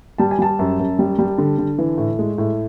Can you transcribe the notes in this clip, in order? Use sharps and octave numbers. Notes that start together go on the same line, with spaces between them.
G3 A5
G#5
G3 A5
F#2
F#2
G3
G3
D3
D3
E3
A2
G#3
A2